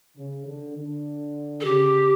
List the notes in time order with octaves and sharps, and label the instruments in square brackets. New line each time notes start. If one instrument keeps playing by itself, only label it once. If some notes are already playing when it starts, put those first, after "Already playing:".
[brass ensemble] C#3
D3
D3
[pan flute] A4
[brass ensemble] C#3 [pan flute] G4